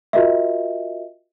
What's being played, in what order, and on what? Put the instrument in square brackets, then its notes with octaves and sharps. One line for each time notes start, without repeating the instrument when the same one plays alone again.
[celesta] F4 F#4 A#4 D#5 E5